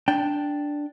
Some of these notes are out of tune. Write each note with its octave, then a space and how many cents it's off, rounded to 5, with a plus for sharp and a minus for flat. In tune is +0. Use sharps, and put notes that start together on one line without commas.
D4 +0 G5 +0